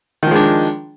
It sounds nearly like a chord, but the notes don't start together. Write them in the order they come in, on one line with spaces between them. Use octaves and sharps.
D#3 F3 G#3 D4